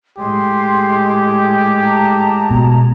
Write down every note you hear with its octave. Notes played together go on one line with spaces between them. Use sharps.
A2 G#3 G4 C6
A5 A#5
B2